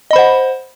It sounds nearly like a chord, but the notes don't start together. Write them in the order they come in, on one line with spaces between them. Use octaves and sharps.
D#5 B5 C5 F#5